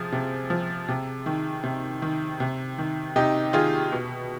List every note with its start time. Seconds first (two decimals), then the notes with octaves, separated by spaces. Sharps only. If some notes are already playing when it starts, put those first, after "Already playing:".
Already playing: C3 F3 G#4
0.12 C3
0.50 F3
0.88 C3
1.26 D#3
1.64 C3
2.02 D#3
2.40 C3
2.78 D#3
3.16 C3 D#4 G4
3.53 D#3 F4 G#4
3.92 B2